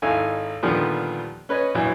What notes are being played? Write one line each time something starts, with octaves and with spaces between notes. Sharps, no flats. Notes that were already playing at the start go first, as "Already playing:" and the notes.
G#1 D#4 E4 A4 F5 G#5
A#2 D3 D#3 F3 G3 B3
C#4 B4 C#5 D#5
A#1 E3 F#3